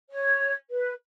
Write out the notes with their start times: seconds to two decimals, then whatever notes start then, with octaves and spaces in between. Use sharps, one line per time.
0.11 C#5
0.70 B4